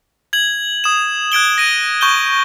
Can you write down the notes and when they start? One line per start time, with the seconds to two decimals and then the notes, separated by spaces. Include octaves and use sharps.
0.33 G#6 F#7
0.84 D#6 E7
1.32 F#6 G#6 D7 G7
1.58 A#6 D#7
2.01 C#6 G6 G7